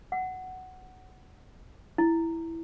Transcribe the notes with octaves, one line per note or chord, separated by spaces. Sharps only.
F#5
E4